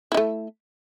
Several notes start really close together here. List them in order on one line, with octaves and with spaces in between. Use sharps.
E4 D#4 A3